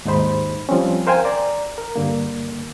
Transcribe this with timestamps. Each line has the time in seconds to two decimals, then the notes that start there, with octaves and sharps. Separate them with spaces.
0.05 D#2 G#2 D#4 C5 B5
0.69 F3 G3 C4 C#4
1.07 A#4 C5 F5 G5 G#5
1.25 D5 A#5
1.78 A#4
1.96 G2 D3 A#3